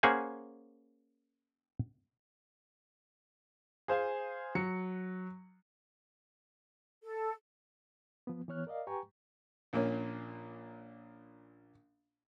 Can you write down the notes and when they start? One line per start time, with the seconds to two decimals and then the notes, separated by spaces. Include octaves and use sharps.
0.03 A#3 C#4 G#4 C5 F#5 G#5
3.88 G#4 C5 F5 G#5
4.55 F#3 C#7
7.04 A4
8.27 F3 B3
8.48 E3 B3 C#5 F6 F#6
8.67 A#4 D5 D#5 F5
8.87 G4 B4 G5 G#5 A#5 C#6
9.73 A#1 A#2 A#3 C#4